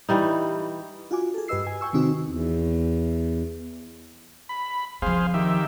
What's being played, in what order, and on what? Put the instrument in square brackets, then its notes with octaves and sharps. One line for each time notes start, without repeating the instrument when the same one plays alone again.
[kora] E3 G3 D#4
[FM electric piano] F4 F#4 G#5 D6
G#4 A4
G2 G4 B4 D#5 E6 C7
G#5
G5 G#5 C#6 E6
C3 D#3 C4 D#4 F#4
[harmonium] E2
[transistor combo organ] B5
[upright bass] F3 C4 [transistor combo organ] G#4 C5 F5
[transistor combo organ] D#3 G4 E5